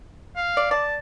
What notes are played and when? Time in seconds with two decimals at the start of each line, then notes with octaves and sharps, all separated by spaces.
0.36 F5
0.57 D5
0.71 D5 A5